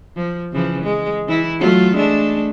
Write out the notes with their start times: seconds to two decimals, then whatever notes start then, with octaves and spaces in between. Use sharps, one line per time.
0.16 F3
0.53 C#3 E3 F3
0.83 G#3
1.28 E3 E4
1.59 F#3 A3 F4
1.95 G#3 A3 D4